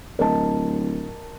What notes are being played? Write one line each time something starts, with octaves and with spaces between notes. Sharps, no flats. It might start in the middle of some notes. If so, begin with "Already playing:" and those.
D1 A#4 D#5 A5